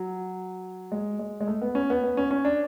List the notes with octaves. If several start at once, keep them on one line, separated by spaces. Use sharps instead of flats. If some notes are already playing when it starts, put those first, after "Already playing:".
Already playing: F#3
G#3
G#3
G#3
A3
B3
C#4
B3
B3
C#4
C#4
D4